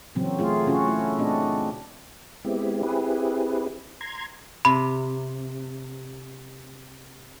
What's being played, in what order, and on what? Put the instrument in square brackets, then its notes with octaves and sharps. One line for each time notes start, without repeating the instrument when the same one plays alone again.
[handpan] A#2 C#3 E3 F#3 C4
A3 F4 G#4
C#3 C#4 F4 F#4
A3 E4
A#2 A3 C4 D4 F#4 D#5
[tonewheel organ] G#3 B3 C4 E4 G4
C4 E4 G4 G#4 B4
A#5 C6 G#6
[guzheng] C3 [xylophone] B5